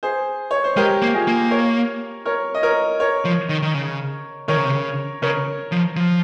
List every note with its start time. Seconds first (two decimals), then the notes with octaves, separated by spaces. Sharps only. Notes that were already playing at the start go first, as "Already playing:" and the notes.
0.03 G#4 C5
0.51 C#5
0.64 C5
0.77 G#3 G4 A#4
1.02 A#3
1.14 F4 G#4
1.27 A#3
1.51 A#4 C#5
2.25 A#4 C#5
2.55 D#5
2.63 A#4 C#5
3.00 A#4 C#5
3.25 F3
3.49 D#3
3.62 D#3
3.74 C#3
4.48 D#3 A#4 C#5
4.56 C#3
4.64 C3
4.72 C#3
5.22 C#3 A#4 C#5
5.72 F3
5.96 F3